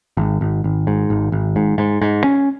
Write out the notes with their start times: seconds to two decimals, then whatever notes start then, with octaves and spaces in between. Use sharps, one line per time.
0.17 G#1
0.41 G#1
0.64 G#1
0.87 G#2
1.10 G#1
1.32 G#1
1.56 G#2
1.78 G#2
2.02 G#2
2.24 C#4